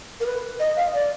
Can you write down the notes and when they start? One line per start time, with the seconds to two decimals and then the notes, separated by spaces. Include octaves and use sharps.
0.20 A#4
0.26 B4
0.60 D#5
0.77 F5
0.94 D5